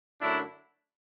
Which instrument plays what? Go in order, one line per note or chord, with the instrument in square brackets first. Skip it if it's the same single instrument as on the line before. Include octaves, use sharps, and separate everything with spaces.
[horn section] F#2 D3 F#3 A3 D4 E4